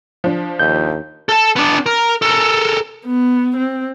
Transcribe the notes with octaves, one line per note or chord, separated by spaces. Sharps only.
F3 D4
D#2 G6
A4 A5
B3 D4
A#4
A4 A#4
B3
C4